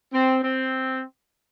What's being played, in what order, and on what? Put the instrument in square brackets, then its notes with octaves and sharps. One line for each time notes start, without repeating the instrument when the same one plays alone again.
[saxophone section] C4
C4